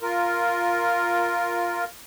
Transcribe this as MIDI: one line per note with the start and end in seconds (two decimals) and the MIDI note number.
0.01 1.84 65
0.01 1.84 70